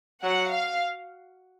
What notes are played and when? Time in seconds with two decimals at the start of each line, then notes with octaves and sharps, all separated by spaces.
0.23 F#3 F#5
0.52 F5